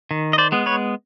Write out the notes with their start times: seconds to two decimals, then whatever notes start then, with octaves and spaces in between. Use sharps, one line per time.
0.11 D#3
0.33 D#5
0.38 C5 D5
0.52 G#3 B3
0.66 B4 C#5